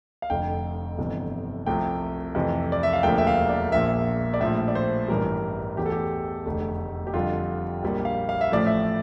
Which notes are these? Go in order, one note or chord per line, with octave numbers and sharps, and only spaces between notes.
F5
F1 F2 D3 G5
G1 F2 C3 E3
C2 C3 F3 A3 G5
F2 C3 E3 A3
D5
E5
F5
E1 D2 D3 F3 A#3 G5
E5
F5
D5
A#1 A#2 F3 A#3 E5
D5
A#1 A2 F3 E5
D5
C5
A1 G2 E3 G3 A#4
E2 E3 A3 G4
A4
G4
F1 E2 D3 A3
G4
F2 D3 G3 F4
A#1 A#2 G3 A#3
F5
F5
E5
A1 A2 F3 A3 D5
E5